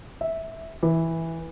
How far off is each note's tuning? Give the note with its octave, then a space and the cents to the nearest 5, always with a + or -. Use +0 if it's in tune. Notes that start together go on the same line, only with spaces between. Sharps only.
E5 -10
E3 -5